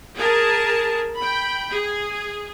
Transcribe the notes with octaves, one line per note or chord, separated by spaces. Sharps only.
G#4 A#4 A5
G5 B5
G#4